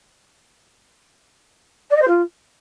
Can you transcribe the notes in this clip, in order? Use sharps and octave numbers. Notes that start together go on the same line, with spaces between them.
D5
D#5
C5
F4